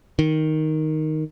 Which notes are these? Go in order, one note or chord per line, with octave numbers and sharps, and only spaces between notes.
D#3